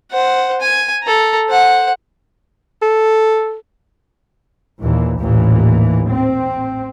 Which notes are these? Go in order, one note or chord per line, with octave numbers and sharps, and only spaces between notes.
C5 F#5
G#5
A4 A#5
C5 F#5
A4
D#2 A#2 E3
A1 D#2 A#2 E3
C4